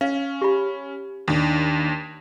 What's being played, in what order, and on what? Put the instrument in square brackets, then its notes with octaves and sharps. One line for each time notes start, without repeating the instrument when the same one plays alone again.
[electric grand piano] C#4 [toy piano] F5
[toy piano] G4 B5
[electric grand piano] D#2 [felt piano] D#3 D4